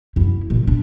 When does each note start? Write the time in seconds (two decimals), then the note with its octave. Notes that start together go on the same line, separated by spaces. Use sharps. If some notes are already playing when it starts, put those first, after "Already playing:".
0.16 F#2 E4
0.50 A#2 C#3
0.67 D4